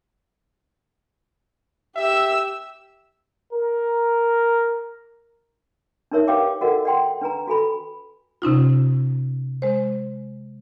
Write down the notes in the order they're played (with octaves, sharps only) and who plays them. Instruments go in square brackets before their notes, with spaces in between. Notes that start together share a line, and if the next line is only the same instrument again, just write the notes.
[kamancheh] G4 E6 [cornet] E5
[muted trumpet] A#4
[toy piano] D4 D#4 A#4 C#5 E5
G4 B4 C#5 F5 G5 D6
F#4 A4 A#4 D#5 F#5
D5 F#5 G5 C6
D4 B4 G#5 A#5
F#4 A4 G#5 B5
[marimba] C3 C#4 D#4 F4
G#3 C5